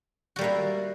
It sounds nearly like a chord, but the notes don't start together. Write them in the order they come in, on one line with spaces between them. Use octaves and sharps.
F#4 G3 A#3 E4